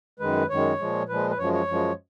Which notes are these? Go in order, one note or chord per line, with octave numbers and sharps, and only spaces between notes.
F#2 D#3 G#3 B4
F#2 D#3 G#3 C#5
A#2 F3 G#3
A#2 F3 G#3 B4
B4
F#2 F3 G#3 C#5
C#5
F#2 F3 G#3